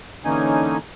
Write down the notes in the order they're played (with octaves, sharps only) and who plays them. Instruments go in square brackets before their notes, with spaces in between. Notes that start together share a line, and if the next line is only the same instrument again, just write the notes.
[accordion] D3 E3 A#3 C#4 D#4 G#5